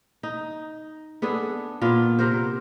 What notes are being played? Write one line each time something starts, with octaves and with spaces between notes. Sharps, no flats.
D#4
B3 D4 G#4 A4
A#2 B3 F4
C3 A#4 C5